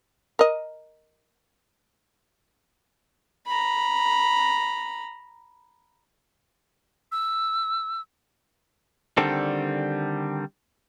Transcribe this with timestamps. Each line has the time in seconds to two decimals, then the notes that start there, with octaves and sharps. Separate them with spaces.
0.39 A#4 D#5
3.47 A#5 B5
7.12 E6
9.17 D3 D#3 G3 C4 A4